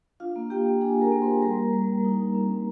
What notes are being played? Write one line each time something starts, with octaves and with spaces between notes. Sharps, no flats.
D4 F4 F5
A#3
A#3 G4 G5
A#3
D4 G#4 G#5
A#3 A#4 A#5
A#3
C5 C6
A#3
G3 A#4 A#5
G3
G3
G3
D#4
D#4
C4
G3